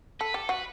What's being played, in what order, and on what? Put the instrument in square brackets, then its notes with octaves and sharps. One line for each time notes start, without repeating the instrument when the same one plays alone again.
[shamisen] A4 [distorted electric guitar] B4
[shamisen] G4 [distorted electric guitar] A4
[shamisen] F#4 [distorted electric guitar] B4